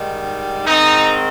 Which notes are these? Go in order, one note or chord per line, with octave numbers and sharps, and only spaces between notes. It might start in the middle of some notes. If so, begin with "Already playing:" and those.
Already playing: G#2 D#3 G3
G#2 D#3 G#3 C4 D#4